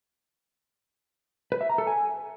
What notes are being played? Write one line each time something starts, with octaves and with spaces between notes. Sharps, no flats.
B4
E5
A#5
A4
G#5